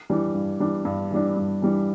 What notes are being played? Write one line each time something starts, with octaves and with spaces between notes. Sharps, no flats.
E3 G3 D4
G2
E3 G3 D4
G2
E3 G3 D4
G2
E3 G3 D4